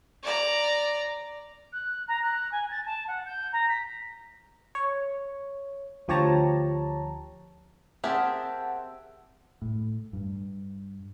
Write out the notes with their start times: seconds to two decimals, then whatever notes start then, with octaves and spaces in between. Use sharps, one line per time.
0.23 D5 A#5
1.73 F#6
2.08 A#5
2.23 F#6
2.52 G#5
2.71 A6
2.86 A5
3.08 F#5
3.26 G6
3.53 A#5
3.69 B6
4.75 C#5
6.08 D2 F3 G4 C#5 A5 A#5
8.04 C4 G4 G#4 A#4 E5 F#5 A5 E6
9.62 A2
10.13 G2